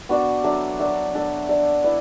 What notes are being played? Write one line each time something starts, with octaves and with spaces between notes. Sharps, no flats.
B3 D4 F#4 D5
F#3 D4 A4 E5
F#3 D4 A4 E5
D4 A4 D5
D4 A4 D5
E4 B4 D5